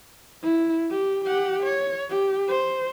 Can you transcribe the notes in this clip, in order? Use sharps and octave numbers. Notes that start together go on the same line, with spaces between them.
E4
G4
G4 F#5
C#5
G4
C5